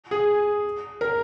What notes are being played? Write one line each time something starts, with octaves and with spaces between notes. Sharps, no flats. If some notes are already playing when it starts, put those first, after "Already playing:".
G#4
A#4